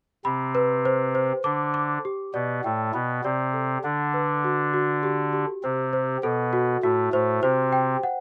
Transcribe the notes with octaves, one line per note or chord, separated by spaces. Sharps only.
C3 C4 B5
B4
C5
C5
D3 D4 D6
D6
G4
B2 B3 D5
A2 A3 G5
B2 B3 B5
C3 C4 D5
A4
D3 D4 F#5
B4
F#4
F#4
G4
G4
C3 C4 C5
C5
B2 B3 A4
F#4
A2 A3 F#4
A2 A3 C5
C3 C4 C5
G5
F#5